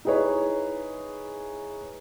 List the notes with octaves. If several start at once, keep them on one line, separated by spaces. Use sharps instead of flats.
D#4 E4 G#4 B4 C#5